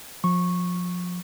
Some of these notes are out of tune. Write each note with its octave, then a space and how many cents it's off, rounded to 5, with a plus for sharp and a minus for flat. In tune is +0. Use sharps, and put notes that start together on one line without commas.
F3 +30 C#6 -10